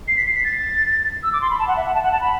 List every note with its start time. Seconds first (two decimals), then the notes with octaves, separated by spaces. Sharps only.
0.08 C7
0.17 B6
0.26 C7
0.35 B6
0.44 A6
1.23 E6
1.33 D6
1.41 C6
1.50 B5
1.59 A5
1.68 F#5
1.76 E5
1.86 F#5
1.94 A5
2.03 F#5
2.12 A5
2.21 B5